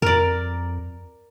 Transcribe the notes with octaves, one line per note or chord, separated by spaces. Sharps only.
F2 A#4 D5